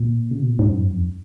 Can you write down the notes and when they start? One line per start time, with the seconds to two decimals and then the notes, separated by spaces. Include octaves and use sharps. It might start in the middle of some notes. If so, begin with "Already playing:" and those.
Already playing: A#2
0.31 C#3
0.40 B2
0.50 A#2
0.59 G#2
0.70 F#2
0.92 F2